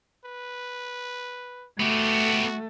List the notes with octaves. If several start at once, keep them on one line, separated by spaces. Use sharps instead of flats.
B4
A3 B3 F#4 G4